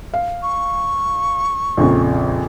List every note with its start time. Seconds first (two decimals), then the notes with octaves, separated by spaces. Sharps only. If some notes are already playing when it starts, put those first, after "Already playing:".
0.14 F5
0.43 C#6
1.77 A#1 F2 C#3